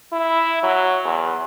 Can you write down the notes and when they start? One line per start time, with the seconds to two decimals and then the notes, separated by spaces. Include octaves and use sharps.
0.13 E4
0.63 F#3
1.05 E2